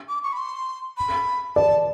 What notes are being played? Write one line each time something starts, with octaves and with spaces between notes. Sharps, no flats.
D6
C#6
B5
C6
B5
D5 A5